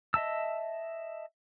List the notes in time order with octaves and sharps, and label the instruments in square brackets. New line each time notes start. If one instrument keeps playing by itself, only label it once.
[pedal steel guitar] D#5 E5 A5 E6